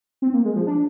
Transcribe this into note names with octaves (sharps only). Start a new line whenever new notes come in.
C4
A#3
G#3
F3
D4